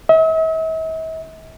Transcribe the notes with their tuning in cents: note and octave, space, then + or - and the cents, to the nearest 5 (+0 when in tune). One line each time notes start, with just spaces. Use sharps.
E5 -45